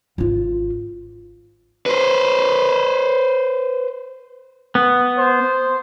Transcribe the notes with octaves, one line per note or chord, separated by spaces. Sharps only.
G#1 F4
B4 C5
B3
C5